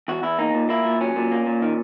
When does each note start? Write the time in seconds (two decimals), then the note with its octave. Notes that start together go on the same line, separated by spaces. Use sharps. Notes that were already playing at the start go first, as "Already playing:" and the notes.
0.08 E2 F#4
0.23 E2 E4
0.39 A#3 D#4
0.54 A#2
0.69 A#3 E4
0.85 A#2
1.01 F#3 C#4
1.16 A#2
1.31 A#3
1.46 A#2
1.62 D#3